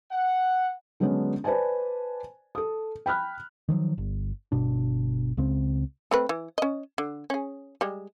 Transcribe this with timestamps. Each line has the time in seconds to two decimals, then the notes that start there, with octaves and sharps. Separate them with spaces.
0.11 F#5
1.00 D3 F#3 G#3 B3 C#4 D4
1.44 B4 C5 D5 G#5 A5
2.55 A4 D#6
3.06 G5 B5 F6 F#6
3.69 D#3 F3 F#3
3.98 G1
4.52 G1 B2 D4
5.37 C#2 C#3 C4
6.11 A3 C4 B4
6.29 E3
6.58 C#4 D#5
6.98 D3
7.30 C#4 G#4
7.81 G3 G#3